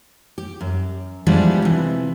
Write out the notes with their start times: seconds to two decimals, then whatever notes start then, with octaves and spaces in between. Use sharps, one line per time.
0.38 G4
0.61 F#2
1.26 E3 F3 G3 G#3 B3 D4
1.62 C3 E3